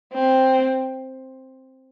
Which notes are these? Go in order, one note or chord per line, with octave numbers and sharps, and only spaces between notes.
C4